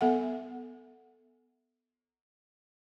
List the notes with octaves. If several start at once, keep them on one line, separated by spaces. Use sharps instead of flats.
B3 A4 E5 F#5